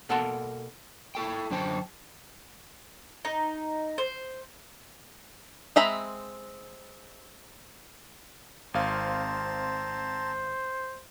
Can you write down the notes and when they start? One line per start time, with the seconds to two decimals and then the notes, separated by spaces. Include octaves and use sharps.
0.09 B2 A#3 A4 F#5 A5 C6
1.15 E4 A4 G5
1.51 F#2 D3 C5 G5 A5
3.25 D#4
3.98 C5
5.76 G#3 C4 E5 A#5 B5
8.74 G#1 C4 C5 F5 A5 A#5